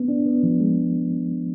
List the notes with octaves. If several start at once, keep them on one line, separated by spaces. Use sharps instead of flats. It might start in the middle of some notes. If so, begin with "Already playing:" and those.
Already playing: B3
D4
B3
F3
G#3